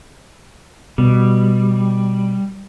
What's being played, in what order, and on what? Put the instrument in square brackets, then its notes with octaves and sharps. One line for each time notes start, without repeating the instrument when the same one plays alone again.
[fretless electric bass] B2 [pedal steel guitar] G3